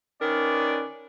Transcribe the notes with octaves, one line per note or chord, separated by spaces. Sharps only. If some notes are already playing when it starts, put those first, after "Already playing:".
D#3 C#4 D4 A#4 B4 D5